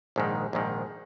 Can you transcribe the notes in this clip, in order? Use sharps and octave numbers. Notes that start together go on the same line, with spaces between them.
A#1 G#2 D#3
A#1 G#2 D#3